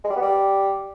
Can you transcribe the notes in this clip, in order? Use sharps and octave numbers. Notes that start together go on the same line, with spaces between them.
G#3
G3
B3
G3